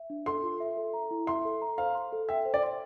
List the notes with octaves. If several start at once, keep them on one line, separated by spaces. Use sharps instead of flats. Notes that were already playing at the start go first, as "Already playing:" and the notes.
Already playing: E5
D4
A4 C6
F4
E5
A4
A#5
E4
E5 C6
A4
A#5
C5 F5
C6
A4
E5 G5
C5
D5
C6